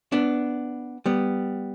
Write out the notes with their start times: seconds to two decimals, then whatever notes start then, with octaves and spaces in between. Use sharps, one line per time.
0.12 B3 D4
1.06 G3 B3